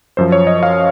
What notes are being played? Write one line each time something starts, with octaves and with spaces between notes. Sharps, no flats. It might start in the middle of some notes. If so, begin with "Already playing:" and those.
F#2 F3 C5
C#5
D#5
F5